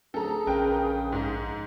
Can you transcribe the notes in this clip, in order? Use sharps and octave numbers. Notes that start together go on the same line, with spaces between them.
D1 G#4 A4 A#5
A#1 C#3 A#4 B4 G5
G#2 D#4